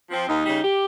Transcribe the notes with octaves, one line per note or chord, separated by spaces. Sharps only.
F3 C4
D#2 D#4
C#3 G3
G4